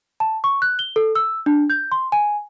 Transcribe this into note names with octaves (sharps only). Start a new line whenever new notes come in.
A5
C#6
F#6
G7
A4
E6
D4
G6
C6
G#5